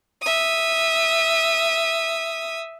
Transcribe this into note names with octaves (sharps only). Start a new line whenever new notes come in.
E5 D#6